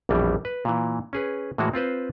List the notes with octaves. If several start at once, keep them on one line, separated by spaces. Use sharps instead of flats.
A#1 F2 B2 E3 G3
B4
A#2 E3
C#4 G#4 B4
A2 E3 G#3 A#3 F#4
C4 F4 B4 C5